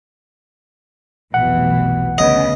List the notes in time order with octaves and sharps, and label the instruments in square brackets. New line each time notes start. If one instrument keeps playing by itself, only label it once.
[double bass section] F1 B1 B2 [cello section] E3 [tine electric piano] F#5
[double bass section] D2 [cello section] C#3 B3 [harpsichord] D#5